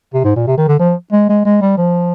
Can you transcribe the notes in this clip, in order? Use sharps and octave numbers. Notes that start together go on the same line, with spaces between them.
C3
G#2
A#2
C3
D#3
D3
F3
G#3
G#3
G#3
G3
F3